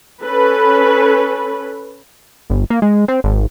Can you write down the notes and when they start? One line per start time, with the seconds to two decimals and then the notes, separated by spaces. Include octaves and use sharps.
0.22 C#4 A4 B4
2.50 G1
2.70 A#3
2.82 G#3
3.08 C4
3.24 G#1